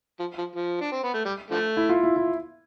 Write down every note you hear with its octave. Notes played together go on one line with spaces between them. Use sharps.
F3
F3
F3
D4
C4
B3
A3
G3
D3 F3 A3
E4
F4
E4
E4